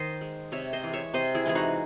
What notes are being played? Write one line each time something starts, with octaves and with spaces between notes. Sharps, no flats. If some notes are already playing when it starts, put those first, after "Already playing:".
Already playing: D#3 C5 D#5
G#3
C3 C#5 E5
C5 D#5
E3 G#3
C#5 E5
C3 C5 D#5
E4 G#4
E3 G#3 G#4
D#4 F#4